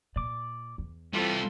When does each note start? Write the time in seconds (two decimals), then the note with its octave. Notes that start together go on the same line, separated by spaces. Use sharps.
0.16 A#2 D5 D6
0.78 E2
1.14 E3 G3 C4 F4 A4